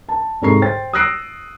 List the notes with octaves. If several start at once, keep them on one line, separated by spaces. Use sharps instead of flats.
A5
C2 G#2 A4 A#5 C#6 C7
C5 G5 A6
D#6 E6 F#6 A#6 C7 D7